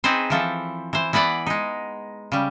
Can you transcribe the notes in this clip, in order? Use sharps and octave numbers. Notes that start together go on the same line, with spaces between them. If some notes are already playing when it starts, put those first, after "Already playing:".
C4 D#4 G#4 B4 C5
E3 F3 A4
E3 C5
E3 B3 B4 D5 F#5
G#3 D#4
C#3 G3